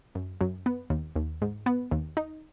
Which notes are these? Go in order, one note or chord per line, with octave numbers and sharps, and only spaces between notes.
F#2
F#2
B3
D#2
D#2
G#2
B3
D#2
D#4